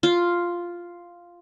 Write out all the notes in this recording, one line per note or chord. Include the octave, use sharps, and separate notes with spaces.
F4